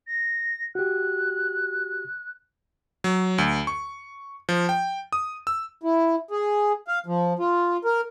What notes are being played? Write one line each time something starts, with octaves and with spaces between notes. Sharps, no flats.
A#6
F#4 G4 F#6
F#3
D2
C#6
F3
G5
D#6
E6
E4
G#4
F5
F3
F4
A#4